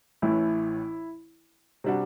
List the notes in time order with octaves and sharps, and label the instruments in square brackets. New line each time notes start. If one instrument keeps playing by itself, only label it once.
[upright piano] A1 A2 E3 [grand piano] E4
[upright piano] C3 G3 D4 F#4